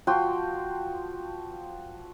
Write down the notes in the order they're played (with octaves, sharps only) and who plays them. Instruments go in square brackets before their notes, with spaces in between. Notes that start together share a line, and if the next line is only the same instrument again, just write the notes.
[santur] F3 F#4 G5 C6